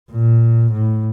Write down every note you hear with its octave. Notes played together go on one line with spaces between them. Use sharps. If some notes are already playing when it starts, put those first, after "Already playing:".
A#2
A2